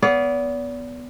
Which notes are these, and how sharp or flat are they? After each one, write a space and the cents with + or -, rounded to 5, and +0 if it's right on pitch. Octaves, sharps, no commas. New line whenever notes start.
B3 +0 D5 -40 F5 +0